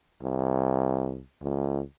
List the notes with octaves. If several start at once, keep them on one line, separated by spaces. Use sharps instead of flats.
C2
C#2